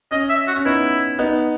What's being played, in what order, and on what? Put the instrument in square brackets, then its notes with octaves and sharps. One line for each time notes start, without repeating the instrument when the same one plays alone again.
[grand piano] C#4 [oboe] D#5
[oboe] E5
F#4
[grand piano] C#4
[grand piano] B3 D#4 [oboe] E4
[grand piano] B3 D#4